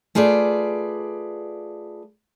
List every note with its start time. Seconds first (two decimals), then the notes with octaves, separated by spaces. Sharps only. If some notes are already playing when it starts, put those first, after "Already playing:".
0.15 A3 F4 G#4 B4 D5